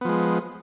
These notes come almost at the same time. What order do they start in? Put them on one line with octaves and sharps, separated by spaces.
B3 F3 G#3